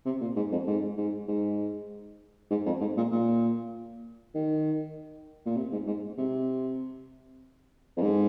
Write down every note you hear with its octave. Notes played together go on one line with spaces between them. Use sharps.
C3
A#2
G#2
F2
G#2
G#2
G#2
G#2
F2
G#2
A#2
A#2
D#3
A#2
C3
G#2
G#2
C3
F2
G#2